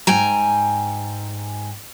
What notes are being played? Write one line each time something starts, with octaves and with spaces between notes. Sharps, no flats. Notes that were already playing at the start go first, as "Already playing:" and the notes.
G#2 G5 G#5 A#5